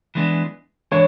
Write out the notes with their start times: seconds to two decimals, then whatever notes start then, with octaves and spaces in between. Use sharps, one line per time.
0.15 E3 G#3 B3 D4
0.91 E3 G#3 D4 C#5